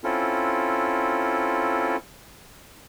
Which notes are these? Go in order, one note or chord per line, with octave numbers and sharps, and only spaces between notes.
C4 C#4 E4 F4 A4